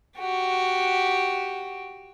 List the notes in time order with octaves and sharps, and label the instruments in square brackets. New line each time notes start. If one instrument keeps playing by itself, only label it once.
[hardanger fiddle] F#4 G4